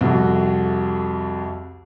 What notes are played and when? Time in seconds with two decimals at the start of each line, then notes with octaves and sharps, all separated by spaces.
0.01 C2 F2 A3 F#4